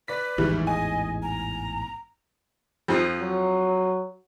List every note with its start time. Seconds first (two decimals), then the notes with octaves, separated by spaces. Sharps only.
0.08 B4 D5 B6
0.38 A1 E2 G#2 D#3 E3 G3
0.67 D#5 G#5
1.23 A#5
2.88 F2 F3
3.20 F#3